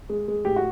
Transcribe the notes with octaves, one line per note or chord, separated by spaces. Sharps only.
G#3
G#3
A2 G4
F#4